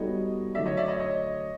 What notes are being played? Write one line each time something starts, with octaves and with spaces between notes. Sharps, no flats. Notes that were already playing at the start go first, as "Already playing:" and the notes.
Already playing: G3 B3 D#4 F#4 A4 C#5 D#5
D3 F#3 A3 D5 E5
C#5 D#5
D5 E5
C#5 D#5
C#5 D#5